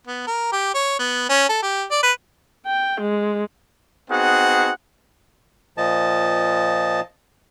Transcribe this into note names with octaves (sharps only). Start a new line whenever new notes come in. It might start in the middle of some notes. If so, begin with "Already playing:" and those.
B3
A#4
G4
C#5
B3
C#4
A4
G4
D5
B4
G5
G#3
B3 C4 D#4 F#4 G#4 F#5
A#2 F3 D#5 A5